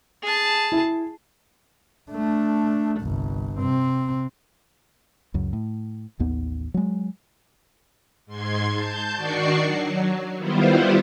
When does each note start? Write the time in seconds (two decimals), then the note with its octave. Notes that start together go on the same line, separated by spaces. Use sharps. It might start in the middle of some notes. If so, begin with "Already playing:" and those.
0.23 G#4 A5
0.72 E4
2.11 A3 D4
3.01 G1 C2
3.59 C3 C4
5.34 C#2 F#2
5.53 A2
6.19 A1 D#2 B3
6.74 F#3 G#3
8.26 G#2 C6 G#6
8.72 A5 G6
9.15 D#3 D4 F#4 D5 C#6 C7
9.64 F#3
10.38 D#3 G3 B3 E4 F4 C5